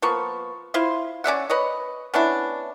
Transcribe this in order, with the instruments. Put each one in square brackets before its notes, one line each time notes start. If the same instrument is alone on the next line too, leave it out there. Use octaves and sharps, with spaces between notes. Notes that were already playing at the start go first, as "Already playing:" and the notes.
[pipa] F3 A#3 B3 C#6
E4 F4 C5 C6
C#4 D5 E5 F#5
B4 C#5 D#5
B3 C#4 D4 E4